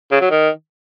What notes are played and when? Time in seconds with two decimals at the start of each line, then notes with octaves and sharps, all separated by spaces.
0.12 C#3
0.21 F#3
0.31 D#3